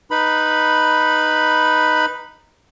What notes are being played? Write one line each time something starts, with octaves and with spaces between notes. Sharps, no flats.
D#4 B4 B5